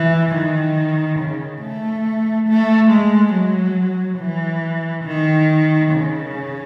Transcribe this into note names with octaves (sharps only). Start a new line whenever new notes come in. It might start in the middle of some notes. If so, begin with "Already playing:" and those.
Already playing: E3
D#3
C#3
A3
A3
G#3
F#3
E3
D#3
C#3